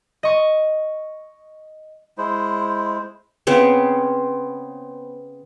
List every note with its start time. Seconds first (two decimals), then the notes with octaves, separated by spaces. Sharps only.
0.23 D#5 C#6
2.18 G#3 E4 C5
3.47 C#3 B3 C4